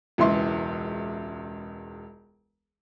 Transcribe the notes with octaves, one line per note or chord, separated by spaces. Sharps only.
E1 C#2 E3 E5 C6